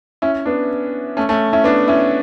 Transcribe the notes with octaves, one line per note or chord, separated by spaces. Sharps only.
C#4 E4
B3 D4
A3 C#4
A3 C#4
C#4 E4
B3 D4
C#4 E4